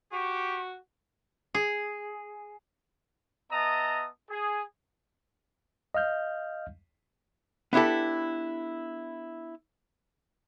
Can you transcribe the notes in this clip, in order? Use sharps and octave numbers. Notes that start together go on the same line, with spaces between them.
F#4 G4 C#6
G#4
B3 D#5 E5 A5 A#5 D#6
G#4
D#5 F5 F6 G6
B3 D4 E4 G4 A4